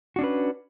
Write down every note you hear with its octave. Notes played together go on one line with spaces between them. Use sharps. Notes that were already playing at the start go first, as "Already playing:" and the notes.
C#4 D4 F#4 B4